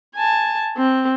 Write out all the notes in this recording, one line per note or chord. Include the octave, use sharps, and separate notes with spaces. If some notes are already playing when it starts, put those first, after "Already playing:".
G#5 A5
C4